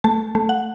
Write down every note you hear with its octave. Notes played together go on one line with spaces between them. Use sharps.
A3 A5
A3
F#5